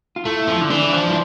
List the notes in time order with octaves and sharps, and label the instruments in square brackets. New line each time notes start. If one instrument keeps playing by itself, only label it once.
[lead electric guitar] F4
[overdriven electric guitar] A3 [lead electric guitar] E4
[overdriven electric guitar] F3
D3
[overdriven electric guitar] E3 [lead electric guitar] D4
[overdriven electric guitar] F3
E3